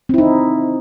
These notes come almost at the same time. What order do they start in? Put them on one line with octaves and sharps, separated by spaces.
C4 E4 D#4